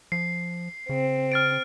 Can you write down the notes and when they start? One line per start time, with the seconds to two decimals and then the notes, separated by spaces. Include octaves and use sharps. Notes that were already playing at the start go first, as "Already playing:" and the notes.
0.12 F3 C7
0.89 C#3 C4
1.32 F6 A6 D7